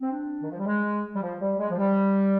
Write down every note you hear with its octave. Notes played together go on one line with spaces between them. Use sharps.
C4
D4
D#3
F3
G3
G#3
G3
F3
G3
G#3
F3
G3